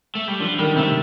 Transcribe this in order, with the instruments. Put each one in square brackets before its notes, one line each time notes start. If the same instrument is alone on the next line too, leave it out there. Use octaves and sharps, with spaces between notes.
[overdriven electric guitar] A3
G3
[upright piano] D3 [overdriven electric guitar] F3
[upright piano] D#3 [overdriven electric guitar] G3
[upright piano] C3 [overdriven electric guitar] A3